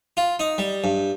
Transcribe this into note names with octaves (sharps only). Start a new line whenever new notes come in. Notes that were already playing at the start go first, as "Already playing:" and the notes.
F4
D#4
G3
G2